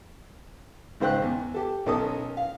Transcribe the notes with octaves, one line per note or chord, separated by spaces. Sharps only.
G#1 C#3 C5 G5 F#6
E2
G4 A4
B1 C#4 A4 A#4 D#6
F5